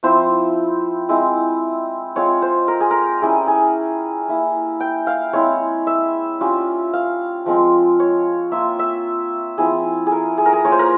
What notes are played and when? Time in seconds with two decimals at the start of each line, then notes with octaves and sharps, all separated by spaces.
0.03 F3 C4 E4 C5
1.09 G#3 C4 E4
2.15 G#3 C4 F4 C#5
2.42 C5
2.68 A#4
2.80 G#4
2.91 A#4
3.22 G3 C#4 E4 G#4
3.47 G#4
4.28 A#3 E4
4.80 G5
5.07 F5
5.33 G#3 C4 E4 C#5
5.87 E5
6.40 G3 C#4 F4
6.93 F5
7.46 F3 G#3 C4 F4
8.00 C#5
8.51 A#3 F4 E5
8.79 E5
9.58 F3 C4 E4 G#4
10.07 G#4
10.12 A#4
10.38 G#4
10.46 A#4
10.53 G#4
10.65 A#3 F4 C#5
10.72 C5
10.79 A#4